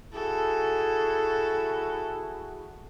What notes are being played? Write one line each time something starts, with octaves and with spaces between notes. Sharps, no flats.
E4 F#4 G#4 A4